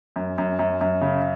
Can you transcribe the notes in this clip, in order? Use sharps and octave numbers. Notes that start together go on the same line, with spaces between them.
F#2
F#2
F#2
F#2
C#3